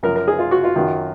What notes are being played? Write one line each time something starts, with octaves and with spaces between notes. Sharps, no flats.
F#2 F3 A#4
A#4
G#4
F4
F#4
F4
F#2 D#3 F#3